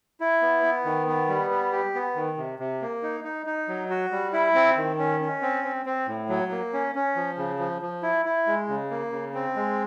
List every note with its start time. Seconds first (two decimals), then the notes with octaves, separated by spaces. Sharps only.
0.20 E4
0.42 B3
0.63 B3
0.85 D#3
1.07 B3
1.29 G3
1.50 B3
1.72 G4
1.95 B3
2.15 D#3
2.37 C3
2.59 C3
2.82 A#3
3.03 D#4
3.24 D#4
3.46 D#4
3.68 F#3
3.90 F#4
4.12 G3
4.33 E4
4.55 C4
4.77 D#3
4.99 C#4
5.21 C#4
5.42 C4
5.64 C4
5.86 C4
6.07 A2
6.29 F#3
6.51 A#3
6.73 C#4
6.95 C#4
7.16 F3
7.38 C#3
7.59 F3
7.82 F3
8.03 E4
8.25 E4
8.47 G#3
8.69 C#3
8.91 A#3
9.12 C#3
9.34 C4
9.56 G#3